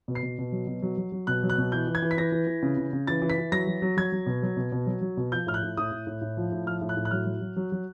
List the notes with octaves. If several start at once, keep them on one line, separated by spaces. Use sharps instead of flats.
B2
C7
B2
B2
F#3
B2
F#3
F#3
F#3
B2 F#6
F#3
F#6
B2
E3 G6
E3
G#6
E3
B6
E3 A#6
E3
E3
C#3
C#3
C#3
E3 A6
E3
B6
E3
F#3 A#6
F#3
F#3
F#3 G#6
F#3
B2
F#3
B2
B2
F#3
F#3
B2
F3 G6
A2 F6
F#6
A2
A2 D#6
A2
A2
A2
F3
A2
F3 F6
A2
F#6
A2
F#6
F#3 F6
F#3
F#3
F#3
F#3